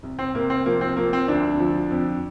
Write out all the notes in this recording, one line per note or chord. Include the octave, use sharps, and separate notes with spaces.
C2
C4
C2 A#3
C4
F3 A#3
C4
F3 A#3
C4
D2 D4
F3
F2